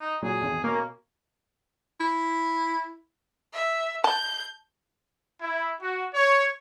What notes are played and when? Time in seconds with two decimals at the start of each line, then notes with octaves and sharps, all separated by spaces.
0.01 D#4
0.22 A#2 F#3 G#4
0.41 G#1 E2
0.64 B2 A#3 C#4
2.00 E4
3.53 E5
4.04 A5 G6
5.41 E4
5.81 F#4
6.13 C#5